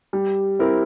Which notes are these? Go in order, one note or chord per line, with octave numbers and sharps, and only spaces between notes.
G3
C4 E4 A#4